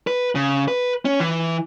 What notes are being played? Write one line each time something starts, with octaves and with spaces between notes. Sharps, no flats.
B4
C#3
B4
C#4
E3